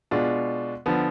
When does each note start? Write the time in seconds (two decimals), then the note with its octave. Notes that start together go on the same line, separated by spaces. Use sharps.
0.11 B2 G#3 D4 F4
0.86 D3 F3 B3